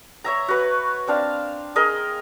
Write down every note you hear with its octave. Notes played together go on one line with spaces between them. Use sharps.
C#5 E5 A#5
F#4 B4
C4 D4 F5
G#4 A#4 D#5